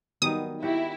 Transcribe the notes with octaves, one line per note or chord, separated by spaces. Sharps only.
D#3 F#3 G3 B3 D#4 D#6
E4 F#4 G4